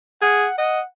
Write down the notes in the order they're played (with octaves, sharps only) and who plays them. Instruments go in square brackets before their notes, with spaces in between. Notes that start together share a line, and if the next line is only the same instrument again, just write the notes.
[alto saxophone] G#4 [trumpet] F#5
[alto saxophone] D#5 [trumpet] F#5